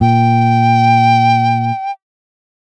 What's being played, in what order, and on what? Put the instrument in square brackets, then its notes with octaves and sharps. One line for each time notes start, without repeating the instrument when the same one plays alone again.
[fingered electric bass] A#2 [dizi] G5